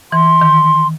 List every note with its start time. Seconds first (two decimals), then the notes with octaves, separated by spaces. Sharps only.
0.12 E3 C6
0.41 D#3